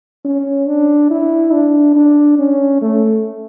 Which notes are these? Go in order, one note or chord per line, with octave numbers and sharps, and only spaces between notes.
C#4
D4
E4
D4
D4
C#4
A3